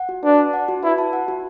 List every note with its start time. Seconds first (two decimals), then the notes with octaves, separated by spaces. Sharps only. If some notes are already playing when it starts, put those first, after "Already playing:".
Already playing: F#5
0.09 F#4
0.23 D4 B4
0.39 A5
0.53 F#5
0.68 F#4
0.83 E4 B4
0.98 A5
1.13 F#5
1.28 F#4